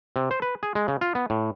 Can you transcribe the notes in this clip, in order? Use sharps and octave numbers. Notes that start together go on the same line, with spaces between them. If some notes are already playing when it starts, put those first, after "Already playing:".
C3
C5
B4
G#4
G#3
C#3
F4
B3
A2